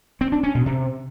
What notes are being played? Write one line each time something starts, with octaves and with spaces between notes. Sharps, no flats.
C4
D4
C#4
B2
C3